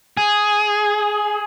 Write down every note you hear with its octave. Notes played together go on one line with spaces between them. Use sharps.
G#4